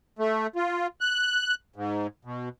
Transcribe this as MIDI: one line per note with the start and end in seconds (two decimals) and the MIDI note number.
0.19 0.47 57
0.56 0.87 65
1.01 1.55 90
1.76 2.07 44
2.25 2.49 47